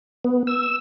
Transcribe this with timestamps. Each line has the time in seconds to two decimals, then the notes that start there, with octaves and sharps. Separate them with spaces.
0.25 B3
0.47 E6